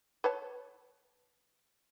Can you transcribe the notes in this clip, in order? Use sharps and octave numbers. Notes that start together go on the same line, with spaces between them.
B4 C#5 A5